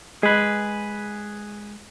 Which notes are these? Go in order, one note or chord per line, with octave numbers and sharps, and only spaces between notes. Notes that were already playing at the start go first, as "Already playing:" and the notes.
G#3 G#4 B4